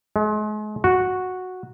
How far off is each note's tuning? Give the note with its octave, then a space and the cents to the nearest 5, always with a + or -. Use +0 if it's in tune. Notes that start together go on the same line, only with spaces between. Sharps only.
G#3 +40
F#4 -5